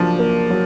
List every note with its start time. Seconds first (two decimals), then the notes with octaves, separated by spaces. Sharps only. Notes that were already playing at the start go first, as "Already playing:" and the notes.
Already playing: F3 F#3 A#3 D4
0.19 A#3
0.50 F#3